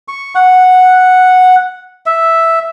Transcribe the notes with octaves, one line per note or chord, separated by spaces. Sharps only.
C#6
F#5
E5